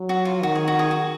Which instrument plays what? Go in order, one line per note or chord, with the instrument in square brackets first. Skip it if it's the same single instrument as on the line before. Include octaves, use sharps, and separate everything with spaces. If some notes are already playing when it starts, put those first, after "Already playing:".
Already playing: [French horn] F#3
[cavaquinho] F#4
F4
[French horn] D#3 [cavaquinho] F#4
[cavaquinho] G#4
F#4
G#4
F#4